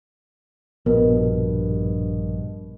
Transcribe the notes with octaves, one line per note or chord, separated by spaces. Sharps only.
A#1 G2 B2 A#4